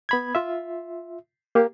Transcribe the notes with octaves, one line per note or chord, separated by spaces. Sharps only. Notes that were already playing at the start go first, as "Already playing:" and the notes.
B3 B5 G#6
F4 E5
A#3 G4